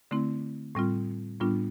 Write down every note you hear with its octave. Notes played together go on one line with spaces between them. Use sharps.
D3 A3 C4 E4
A2 G3 C4 F4
A2 G3 B3 D4 F4